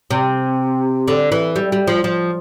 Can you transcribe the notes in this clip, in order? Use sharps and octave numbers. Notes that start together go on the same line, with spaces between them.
C3
D3
E3
G3
G3
F3
F3